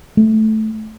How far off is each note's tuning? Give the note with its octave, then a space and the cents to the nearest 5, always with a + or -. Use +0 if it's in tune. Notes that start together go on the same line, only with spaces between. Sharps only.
A3 -10